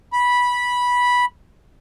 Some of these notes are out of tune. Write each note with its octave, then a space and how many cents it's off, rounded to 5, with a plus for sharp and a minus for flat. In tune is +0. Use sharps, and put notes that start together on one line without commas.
B5 -10